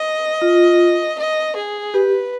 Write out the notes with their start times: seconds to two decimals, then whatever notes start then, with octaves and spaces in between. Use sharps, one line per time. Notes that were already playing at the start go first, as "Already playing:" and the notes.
Already playing: D#5
0.42 F4
1.18 D#5
1.55 G#4
1.94 G4 B4